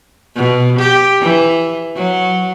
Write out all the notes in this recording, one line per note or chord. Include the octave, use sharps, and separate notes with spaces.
B2
G4
E3
F#3